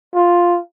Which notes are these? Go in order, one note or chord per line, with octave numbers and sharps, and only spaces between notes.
F4